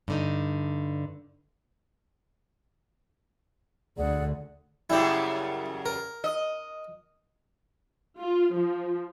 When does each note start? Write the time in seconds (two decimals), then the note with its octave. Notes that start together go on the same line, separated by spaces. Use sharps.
0.08 G2 D3 D#4
3.97 D2 D3 G#4 D5 F#5
4.90 F#2 C#3 G3 E4 G4
5.86 A#4
6.24 D#5
8.18 F4
8.56 F3